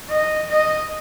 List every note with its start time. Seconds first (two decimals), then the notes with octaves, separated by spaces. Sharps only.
0.09 D#5
0.49 D#5